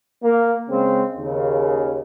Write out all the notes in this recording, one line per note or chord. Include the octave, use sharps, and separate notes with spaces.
A#3
C#3 G#3 C4
D#2 C#3